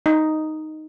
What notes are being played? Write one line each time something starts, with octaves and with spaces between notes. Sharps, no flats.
D#4